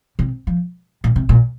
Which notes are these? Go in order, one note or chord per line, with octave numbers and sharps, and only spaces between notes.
C3
F3
A#2
C3
A#2